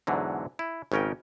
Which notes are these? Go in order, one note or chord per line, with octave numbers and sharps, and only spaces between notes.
E2 G#2 D3 F#3
E4
G#1 C#3 C#4 A#4 G5